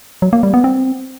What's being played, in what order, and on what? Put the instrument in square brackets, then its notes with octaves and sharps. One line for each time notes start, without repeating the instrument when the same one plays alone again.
[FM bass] F#3
A#3
G3
B3
C4